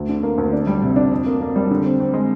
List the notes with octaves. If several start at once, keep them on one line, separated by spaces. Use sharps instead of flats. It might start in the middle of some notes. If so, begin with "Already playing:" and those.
Already playing: D2
D3
A#3
D2
D4
G3
C3
D4
F2
A#3
A#3
G3
D3
C4
C4
G#3